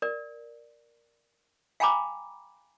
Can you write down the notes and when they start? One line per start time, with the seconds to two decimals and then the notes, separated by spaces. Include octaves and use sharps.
0.02 A#4 D5
1.80 F5 G5 G#5 A#5 B5 D6